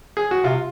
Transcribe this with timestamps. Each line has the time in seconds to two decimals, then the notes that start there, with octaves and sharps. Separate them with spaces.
0.17 G#4
0.31 F#4
0.44 C3 F4